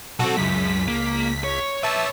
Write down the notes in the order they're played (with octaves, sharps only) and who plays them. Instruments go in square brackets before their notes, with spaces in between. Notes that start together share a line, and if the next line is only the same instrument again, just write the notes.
[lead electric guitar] B1 C4 [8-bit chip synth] F#4 A4
[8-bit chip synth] C#2 B6 [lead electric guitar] F#2
[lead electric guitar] A#3
C#5
[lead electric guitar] B4 C#5 [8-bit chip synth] E5 A5